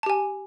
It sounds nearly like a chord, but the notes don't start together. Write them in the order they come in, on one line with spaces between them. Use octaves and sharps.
A5 G4 G#5